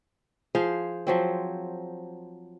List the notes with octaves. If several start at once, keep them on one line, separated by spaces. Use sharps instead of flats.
F3 G#4 C5 F5
F3 F#3 C4